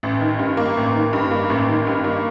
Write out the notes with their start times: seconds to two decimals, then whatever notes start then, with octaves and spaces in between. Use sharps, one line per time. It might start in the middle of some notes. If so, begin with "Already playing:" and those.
0.03 A1
0.21 D#3
0.39 G2
0.57 A#3
0.77 A1
0.95 D#3
1.13 G2
1.31 A#3
1.49 A1
1.68 D#3
1.87 G2
2.04 A#3